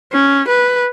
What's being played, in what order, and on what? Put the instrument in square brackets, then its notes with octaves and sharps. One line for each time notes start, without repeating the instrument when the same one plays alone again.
[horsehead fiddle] C#4
B4